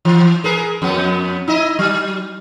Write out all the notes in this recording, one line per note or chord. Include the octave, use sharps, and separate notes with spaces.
E3
G#4 A#4 B4
F2 B3
D#4 E4 D#5
F#3